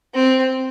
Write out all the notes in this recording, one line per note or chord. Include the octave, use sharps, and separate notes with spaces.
C4